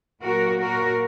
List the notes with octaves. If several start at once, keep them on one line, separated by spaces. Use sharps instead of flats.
A#2 F#3 A#3 F#4 A#4
F#4 A#4